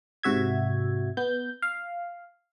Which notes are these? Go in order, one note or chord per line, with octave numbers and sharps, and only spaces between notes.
G#2 C3 F#4 E5 G#6
B3 G6
F5